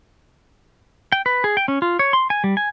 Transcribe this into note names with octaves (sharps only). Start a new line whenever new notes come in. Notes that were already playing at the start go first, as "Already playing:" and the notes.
G5
B4
G#4
G5
C#4
F4
C#5
C6
G#5
G3
G#5